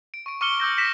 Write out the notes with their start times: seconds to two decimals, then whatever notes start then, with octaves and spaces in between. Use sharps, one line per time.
0.14 D7
0.26 C#6 D7
0.41 C#6 D6 F6 C#7 G7
0.60 D6 E6 G6 A#6
0.77 D6 A#6 B6 E7